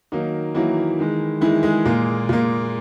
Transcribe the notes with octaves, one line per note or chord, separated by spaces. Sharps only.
D#3 F#3 A#3 D#4
D#3 E3 F#3 A#3 E4
D#3 G#3
D#3 E3 G#3 E4
G#3 G#4
A#2 A#3
A#2 A#3